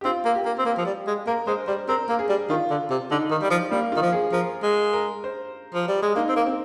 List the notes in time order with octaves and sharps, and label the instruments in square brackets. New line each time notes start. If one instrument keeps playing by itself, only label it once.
[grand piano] G4
[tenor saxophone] C4 [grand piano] F4
[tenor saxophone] A#3
[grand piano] G4
[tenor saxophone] A#3
C4
A#3
F3
G3
G#3
[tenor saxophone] A#3 [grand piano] A#4
[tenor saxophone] G#3 [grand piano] C5
[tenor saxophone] G3 [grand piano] C5
[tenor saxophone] C4 [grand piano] A#4
[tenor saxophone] A#3
[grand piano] G#4
[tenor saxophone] G3
[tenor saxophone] D#3 [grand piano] F4
[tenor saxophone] D3
C3
[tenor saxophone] D3 [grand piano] D#4
[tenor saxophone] D#3
G3
F3
[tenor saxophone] G3 [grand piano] A#3
[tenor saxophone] D#3 [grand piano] F4
[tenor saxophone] F3
[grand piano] G#4
[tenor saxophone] F3 [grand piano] A#4
[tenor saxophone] G#3
[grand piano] A#4
C5
[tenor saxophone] F3
G3
G#3
[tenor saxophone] A#3 [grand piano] D#4
[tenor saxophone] C4
A#3
[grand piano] C4